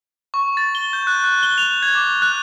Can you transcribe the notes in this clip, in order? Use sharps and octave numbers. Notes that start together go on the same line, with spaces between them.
C#6
A6
G7
G6
F#6
F#6
G7
F7
G#6
D6
F#6